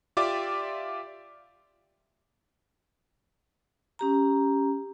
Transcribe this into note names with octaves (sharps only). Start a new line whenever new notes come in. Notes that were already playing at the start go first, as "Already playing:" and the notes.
F4 G4 D5 E5 D6
C#4 G4 A#5